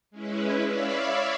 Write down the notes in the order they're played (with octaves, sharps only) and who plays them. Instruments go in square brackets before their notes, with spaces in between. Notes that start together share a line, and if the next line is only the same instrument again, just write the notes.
[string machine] G#3 C#4 E4 B4
C#5 D5 E5 F5 B5